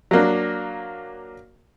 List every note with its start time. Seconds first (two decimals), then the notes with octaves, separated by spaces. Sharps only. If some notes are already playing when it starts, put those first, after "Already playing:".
0.11 F#3 A#3 D4